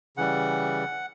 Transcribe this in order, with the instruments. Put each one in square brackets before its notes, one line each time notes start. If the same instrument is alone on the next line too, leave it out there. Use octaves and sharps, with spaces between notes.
[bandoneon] C#3 E3 G3 F#5